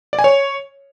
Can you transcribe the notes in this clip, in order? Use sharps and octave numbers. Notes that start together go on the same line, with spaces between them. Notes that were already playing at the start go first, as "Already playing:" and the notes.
D5
G#5
C#5